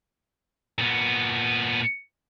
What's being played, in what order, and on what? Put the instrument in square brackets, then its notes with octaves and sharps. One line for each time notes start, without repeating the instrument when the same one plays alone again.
[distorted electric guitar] A#2 B3